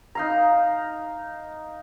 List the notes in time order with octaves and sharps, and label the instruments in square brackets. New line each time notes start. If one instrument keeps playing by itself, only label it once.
[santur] D#4 F5 A#5